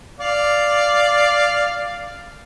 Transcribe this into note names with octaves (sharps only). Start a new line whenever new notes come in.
D5 F5